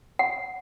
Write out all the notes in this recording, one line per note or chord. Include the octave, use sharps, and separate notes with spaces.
F#5